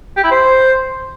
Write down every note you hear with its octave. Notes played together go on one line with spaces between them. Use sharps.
G4
E4
C5